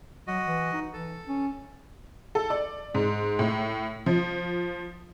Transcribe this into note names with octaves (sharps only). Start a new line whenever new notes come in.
F#3 F#4 D#5
E3
D#4
E3 A4
C#4
A4
D5
G#2
A2
F3